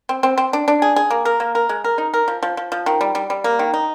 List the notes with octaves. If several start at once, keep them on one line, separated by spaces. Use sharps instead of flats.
C4
C4
C4
D4
D4
G#4
G#4
A#3
A#4
A#3
A#4
G#3
A#4
D#4
A#4
F3
F3
F3
F3
D#3
G3
G3
G3
A#3
D#3
D#4